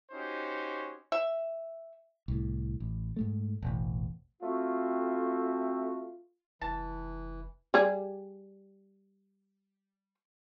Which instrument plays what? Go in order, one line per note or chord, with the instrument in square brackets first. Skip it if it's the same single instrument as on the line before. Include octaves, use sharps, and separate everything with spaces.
[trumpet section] C#4 D#4 F#4 G4 C5 C#5
[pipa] E5
[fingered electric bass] C2 A2
A1
G#2 G#3 A3
E1 A1
[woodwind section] A3 C4 F#4 [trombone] F4
[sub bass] F1 [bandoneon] E3 [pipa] A5
[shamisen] G3 G4 G#4